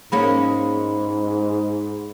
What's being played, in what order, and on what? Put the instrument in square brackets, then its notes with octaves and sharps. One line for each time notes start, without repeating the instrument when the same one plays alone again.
[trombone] G#2 [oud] G#3 A#3 C#4 [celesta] B5